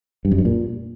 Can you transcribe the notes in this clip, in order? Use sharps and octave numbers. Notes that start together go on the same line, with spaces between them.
G2
F#2
G2
A#2